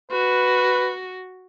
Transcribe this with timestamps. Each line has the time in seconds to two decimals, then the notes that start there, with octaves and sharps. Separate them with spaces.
0.12 F#4 B4